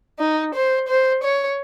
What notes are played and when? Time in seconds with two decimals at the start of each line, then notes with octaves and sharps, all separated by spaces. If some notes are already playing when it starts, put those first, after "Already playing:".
0.19 D#4
0.54 C5
0.88 C5
1.23 C#5